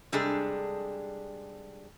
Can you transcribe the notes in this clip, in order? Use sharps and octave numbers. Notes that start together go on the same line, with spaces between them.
C3 G3 G#3 D4 G#4 A4